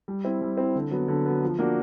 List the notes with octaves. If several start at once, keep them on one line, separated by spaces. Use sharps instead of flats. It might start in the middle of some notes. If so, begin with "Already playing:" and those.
G3
C4 E4
G3
C4 E4
D3
F#3 B3
D3
F#3 B3
F3
A#3 D4 F#4